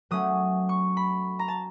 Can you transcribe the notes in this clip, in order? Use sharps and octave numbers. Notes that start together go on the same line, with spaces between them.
F#3 A3 C#4 D#6
C#6
B5
A#5
A5